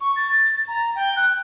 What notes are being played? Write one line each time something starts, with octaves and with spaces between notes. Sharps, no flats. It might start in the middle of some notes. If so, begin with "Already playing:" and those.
C#6
A6
A#5
G5
F#6